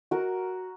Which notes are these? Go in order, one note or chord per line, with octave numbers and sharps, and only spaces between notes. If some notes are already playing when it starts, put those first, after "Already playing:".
F#4 A#4